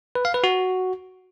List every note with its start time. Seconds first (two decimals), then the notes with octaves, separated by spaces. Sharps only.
0.15 B4
0.25 F5
0.34 B4
0.44 F#4